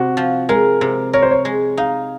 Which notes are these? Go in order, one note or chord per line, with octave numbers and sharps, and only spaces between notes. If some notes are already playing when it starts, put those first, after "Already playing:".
Already playing: C3 F#4
F3
G#3 A#4
C3
A#4 C#5
C5
C#5
G#3
D#4 F5